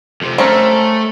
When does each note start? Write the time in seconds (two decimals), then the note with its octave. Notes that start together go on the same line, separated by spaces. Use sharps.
0.22 F2 C3
0.38 A3 C4 C#4 A#4